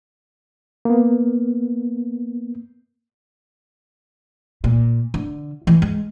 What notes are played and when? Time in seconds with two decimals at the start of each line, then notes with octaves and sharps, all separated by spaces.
0.85 A#3 B3
4.64 A#2
5.14 D3
5.67 E3
5.82 G#3